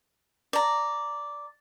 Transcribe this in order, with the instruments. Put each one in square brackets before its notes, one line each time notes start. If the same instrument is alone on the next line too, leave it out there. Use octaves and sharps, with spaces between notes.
[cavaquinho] D5 A#5